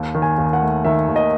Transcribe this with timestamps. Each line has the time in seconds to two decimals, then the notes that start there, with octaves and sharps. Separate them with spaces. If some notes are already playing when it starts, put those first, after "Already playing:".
Already playing: D#2
0.15 D#3
0.22 G#5
0.38 D#2
0.53 F#5
0.62 A3
0.85 D#3 E5
1.08 D#2
1.16 D#5